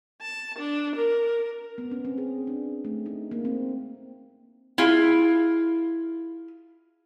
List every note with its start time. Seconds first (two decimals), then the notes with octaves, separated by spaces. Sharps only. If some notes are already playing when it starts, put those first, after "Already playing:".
0.21 A5
0.59 D4
0.96 A#4
1.78 B3
1.91 C#4
2.05 C4
2.18 G#4
2.47 D4
2.85 A3
3.06 D#4
3.31 A#3
3.45 C4
4.78 E4 F4 G#4